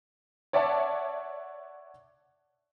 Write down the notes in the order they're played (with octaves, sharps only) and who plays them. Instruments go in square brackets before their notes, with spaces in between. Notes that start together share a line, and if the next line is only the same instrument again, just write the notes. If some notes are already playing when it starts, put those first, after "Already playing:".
[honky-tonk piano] C#5 D5 E5 F#5 A5